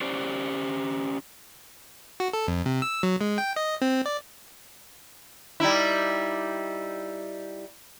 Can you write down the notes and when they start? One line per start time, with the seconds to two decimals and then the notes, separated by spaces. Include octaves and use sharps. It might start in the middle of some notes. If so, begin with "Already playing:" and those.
0.01 C#4 G4 C5 D5
2.20 F#4
2.33 A4
2.48 F2
2.66 C3
2.82 E6
3.03 F#3
3.21 G#3
3.38 G5
3.56 D#5
3.82 C4
4.06 D5
5.60 G3 D#4 E4